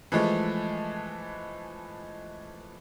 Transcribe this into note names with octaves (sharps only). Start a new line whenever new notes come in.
E3 F3 G#3 A3